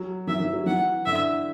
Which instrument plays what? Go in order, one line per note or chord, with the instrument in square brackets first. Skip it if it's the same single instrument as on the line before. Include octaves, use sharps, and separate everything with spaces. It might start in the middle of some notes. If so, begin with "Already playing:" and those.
Already playing: [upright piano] F#3
[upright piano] E3 [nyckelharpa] E5
[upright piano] E3
F#3
[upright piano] E3 [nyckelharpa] F#5
[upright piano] D3 [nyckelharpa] E5